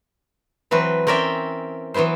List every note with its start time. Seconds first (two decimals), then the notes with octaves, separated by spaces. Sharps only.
0.71 E3 F#3 C4 B4
1.07 C4 C#4 A#4 D5 E5 G5
1.94 E3 F#3 B3 E4 C5